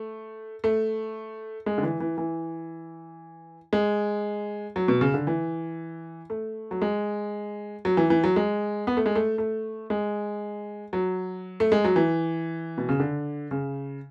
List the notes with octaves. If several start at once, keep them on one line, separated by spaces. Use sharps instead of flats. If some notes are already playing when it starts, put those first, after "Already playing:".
Already playing: A3
A3
G#3
D3
E3
E3
E3
G#3
F#3
B2
C#3
D3
E3
A3
F#3
G#3
F#3
E3
E3
F#3
G#3
B3
A3
G#3
A3
A3
G#3
F#3
A3
G#3
F#3
E3
B2
C#3
D3
C#3